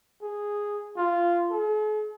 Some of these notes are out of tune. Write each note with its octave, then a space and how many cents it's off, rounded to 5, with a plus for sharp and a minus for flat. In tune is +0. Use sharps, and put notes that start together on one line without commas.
G#4 -5
F4 -10
G#4 +45